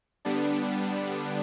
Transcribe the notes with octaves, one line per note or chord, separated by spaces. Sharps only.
D3 G3 B3 D4